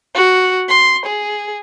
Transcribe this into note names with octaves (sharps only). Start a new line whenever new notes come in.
F#4
C6
G#4